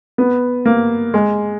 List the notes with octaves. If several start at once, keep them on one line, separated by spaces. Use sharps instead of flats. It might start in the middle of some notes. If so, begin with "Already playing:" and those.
B3
A#3
G#3